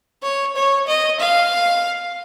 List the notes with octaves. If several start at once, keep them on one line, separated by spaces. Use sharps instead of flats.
C#5
C#5
D#5
F5